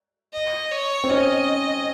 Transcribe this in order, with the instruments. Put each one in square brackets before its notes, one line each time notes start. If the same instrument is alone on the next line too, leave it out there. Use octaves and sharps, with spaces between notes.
[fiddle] D#5
C#5
[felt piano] C4
[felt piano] C#4 [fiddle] D#5